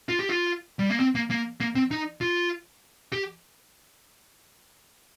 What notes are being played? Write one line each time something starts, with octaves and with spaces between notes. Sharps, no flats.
F4
G4
F4
G3
A#3
C4
A#3
A#3
A#3
C4
D#4
F4
G4